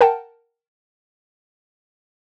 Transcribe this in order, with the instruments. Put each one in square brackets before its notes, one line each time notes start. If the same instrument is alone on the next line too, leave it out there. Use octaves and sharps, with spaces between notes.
[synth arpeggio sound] A#4 F#5 G5 A5